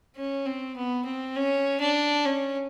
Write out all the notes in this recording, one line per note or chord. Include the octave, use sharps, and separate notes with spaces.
C#4
C4
B3
C4
C#4
D4
C#4